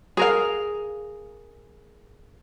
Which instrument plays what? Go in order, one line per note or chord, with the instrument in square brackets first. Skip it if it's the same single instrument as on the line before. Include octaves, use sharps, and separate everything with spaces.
[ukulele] G#4 A#4 F5